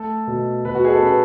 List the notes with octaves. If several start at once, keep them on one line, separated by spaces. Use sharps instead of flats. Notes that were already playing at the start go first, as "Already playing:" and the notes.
Already playing: A3 A4
B2
B2 B4
F#4
G#4
A4
C#4 B4